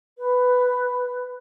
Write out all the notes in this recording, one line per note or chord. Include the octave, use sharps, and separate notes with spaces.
B4